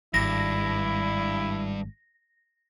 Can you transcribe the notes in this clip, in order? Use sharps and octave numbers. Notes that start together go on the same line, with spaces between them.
G#1 G2 E4 A#6